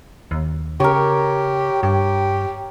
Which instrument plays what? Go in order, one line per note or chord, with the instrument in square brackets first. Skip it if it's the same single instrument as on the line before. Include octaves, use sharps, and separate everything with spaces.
[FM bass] D#2
[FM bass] C#3 [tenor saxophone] G4 [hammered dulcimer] A#4 C#5
[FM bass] G2 [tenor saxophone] G4